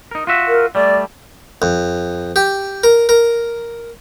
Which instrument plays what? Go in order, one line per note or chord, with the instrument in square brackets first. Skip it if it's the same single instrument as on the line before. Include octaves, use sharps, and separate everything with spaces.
[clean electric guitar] D#4 A#4
F4 F#4 E5
[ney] A#4
[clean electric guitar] G3 A3 [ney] D5
[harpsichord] F2
G4
A#4
A#4